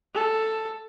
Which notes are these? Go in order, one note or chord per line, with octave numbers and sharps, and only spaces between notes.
A4